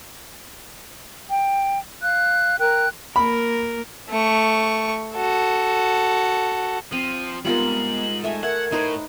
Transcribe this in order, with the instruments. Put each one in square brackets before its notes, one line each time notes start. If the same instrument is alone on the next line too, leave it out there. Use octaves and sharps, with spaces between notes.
[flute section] G5
F5 F#6
A#4 G5 F#6
[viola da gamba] A#3 A#4 [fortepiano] B5
[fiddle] A3 C#6
F#4 A4
[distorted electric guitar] F3 [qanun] C4 [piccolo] D#7
[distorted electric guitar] G#2 [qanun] G3 F4 A#4 [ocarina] B3 [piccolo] F#7
[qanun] A3 E5 G#5
[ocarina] A#4 [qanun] E5 [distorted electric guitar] F#5 [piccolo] G#6
[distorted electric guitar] A2 [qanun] D#4 B4 C5